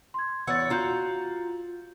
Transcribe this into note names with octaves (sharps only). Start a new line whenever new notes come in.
C6 G#6
E2 C#5 F#5 E6 A6
F4 F#4 A#5 G6